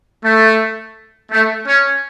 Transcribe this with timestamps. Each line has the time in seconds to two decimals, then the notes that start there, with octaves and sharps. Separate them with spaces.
0.24 A3
1.31 A3
1.67 C#4